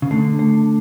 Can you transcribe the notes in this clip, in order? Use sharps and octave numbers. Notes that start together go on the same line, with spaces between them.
C#3
D3 A3
A3